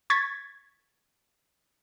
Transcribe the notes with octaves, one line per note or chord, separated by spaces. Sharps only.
C#6 G#6 A6 B6